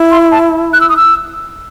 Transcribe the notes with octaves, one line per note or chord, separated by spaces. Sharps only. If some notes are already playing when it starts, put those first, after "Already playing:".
Already playing: E4
C6
A5
F#6
E6
D#6
E6